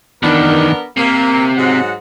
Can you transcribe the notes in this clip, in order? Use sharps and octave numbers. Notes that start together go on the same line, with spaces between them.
E2 D#3 B3 D4 A#4
C3 A#3
G#2 F#3 F#5